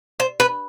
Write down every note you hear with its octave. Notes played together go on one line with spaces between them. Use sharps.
C5
B4